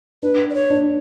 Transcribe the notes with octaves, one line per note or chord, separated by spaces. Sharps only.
D4 B4
D5
C#5
D4